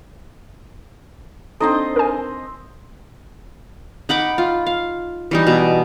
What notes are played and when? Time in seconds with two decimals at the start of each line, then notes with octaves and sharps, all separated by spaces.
1.60 C4 D4 D#4 A4 C5 D#5 A5 A#5
1.96 A#4 G#5
4.09 D#4 F#5 B5 D6
4.38 F4
4.66 F5
5.31 E3 G3 D#4
5.47 B2